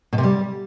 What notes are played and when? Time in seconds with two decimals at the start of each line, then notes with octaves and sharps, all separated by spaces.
0.13 B2
0.18 C3
0.23 G3